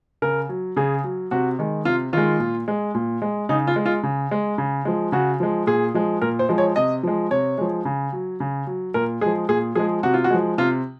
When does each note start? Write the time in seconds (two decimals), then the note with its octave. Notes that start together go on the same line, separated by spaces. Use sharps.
0.22 C#3 A#4
0.49 F#3
0.76 C#3 G#4
1.04 F#3
1.31 C3 F#4
1.59 D#3 G#3
1.85 C3 F4
2.13 D#3 G#3 F4
2.40 A#2
2.68 G#3
2.95 A#2
3.22 G#3
3.49 C#3 D#4
3.67 F4
3.76 G#3
3.86 F4
4.03 C#3
4.31 G#3
4.58 C#3
4.85 F3 G#3
5.12 C#3 F#4
5.40 F3 G#3
5.67 A#2 G#4
5.94 F3 G#3
6.22 A#2 A#4
6.39 C5
6.49 F3 G#3
6.58 C#5
6.76 C3 D#5
7.03 F3 G#3
7.31 C3 C#5
7.58 F3 G#3
7.85 C#3
8.13 F#3
8.40 C#3
8.67 F#3
8.94 A#2 A#4
9.21 F3 G#3 G#4
9.49 A#2 G#4
9.75 F3 G#3 G#4
10.03 C3 F#4
10.14 F4
10.24 F#4
10.30 F3 G#3
10.58 C3 F4